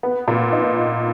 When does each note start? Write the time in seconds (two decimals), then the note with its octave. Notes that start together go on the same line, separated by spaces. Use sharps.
0.03 B3
0.28 A#2
0.53 D#4